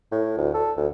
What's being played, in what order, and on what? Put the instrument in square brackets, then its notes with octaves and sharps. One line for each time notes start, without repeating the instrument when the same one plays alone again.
[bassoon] A2
D2
A4
D2